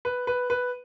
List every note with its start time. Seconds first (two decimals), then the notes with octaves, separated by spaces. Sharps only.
0.05 B4
0.27 B4
0.50 B4